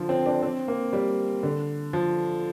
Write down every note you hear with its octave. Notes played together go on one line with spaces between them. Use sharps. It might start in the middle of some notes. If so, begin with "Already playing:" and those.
Already playing: D3 F3
C4
D4
C4
A#3
G3
D3
F3